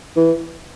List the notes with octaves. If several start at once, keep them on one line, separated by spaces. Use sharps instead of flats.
E3